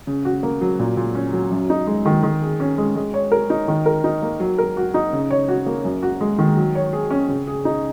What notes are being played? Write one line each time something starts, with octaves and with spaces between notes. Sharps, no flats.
C#3
F#4
A#3
F#3
A#2
A#2
C#4
F#3
F#2
D#4
G#3
D#3
D#3
G#4
C#4
G#3
G#3
C#5
A#4
D#4
D#3
A#4
D#4
A#3
F#3
A#4
F#4
D#4
C#3
C#5
F#4
A#3
F#2
F#4
G#3
D#3
F#3
C#5
G#4
C#4
C#3
G#4
D#4